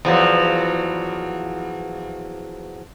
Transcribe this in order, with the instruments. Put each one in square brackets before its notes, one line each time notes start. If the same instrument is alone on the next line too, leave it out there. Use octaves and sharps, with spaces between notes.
[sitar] E2 F3 F#3